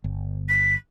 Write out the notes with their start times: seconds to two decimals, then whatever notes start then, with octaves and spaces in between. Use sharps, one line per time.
0.04 G1
0.48 B6